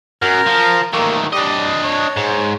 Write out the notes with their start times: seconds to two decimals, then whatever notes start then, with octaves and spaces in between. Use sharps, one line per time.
0.22 F#2 A#4
0.46 F3
0.93 D#3 A3 A#3
1.33 G3 D4 D#5
1.84 C#5
2.16 G#2